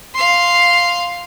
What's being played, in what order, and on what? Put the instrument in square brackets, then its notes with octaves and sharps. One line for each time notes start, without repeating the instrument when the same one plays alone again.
[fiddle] F5 C6